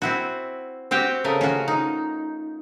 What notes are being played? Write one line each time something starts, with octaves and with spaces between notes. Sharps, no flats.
C4 E4 F#4
C4 F#4 G4 G5
C#3 A3 A#4 D#5
C#4 F4 F#4
D#4